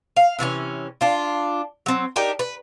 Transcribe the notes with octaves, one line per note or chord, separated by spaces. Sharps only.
F5
C3 E3 B3 C#4
D4 F4
F#3 C4
D4 D#4 G4 A#4
B4